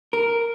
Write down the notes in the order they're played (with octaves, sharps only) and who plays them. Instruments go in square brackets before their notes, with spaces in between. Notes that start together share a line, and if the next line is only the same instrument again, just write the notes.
[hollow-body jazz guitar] A#4